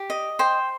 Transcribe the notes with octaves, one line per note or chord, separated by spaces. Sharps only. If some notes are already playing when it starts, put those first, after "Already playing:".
Already playing: G4
D#5
C5 G5